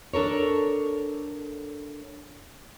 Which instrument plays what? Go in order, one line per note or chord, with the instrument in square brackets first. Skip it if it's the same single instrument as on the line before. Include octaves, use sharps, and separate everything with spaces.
[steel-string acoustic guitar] D4 A4 A#4 C#5